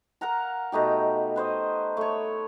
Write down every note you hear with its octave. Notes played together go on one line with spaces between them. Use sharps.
A#4 F5 F#5 A#5
B2 A3 D#4 G4
B4 C5 D#5
A3 C#5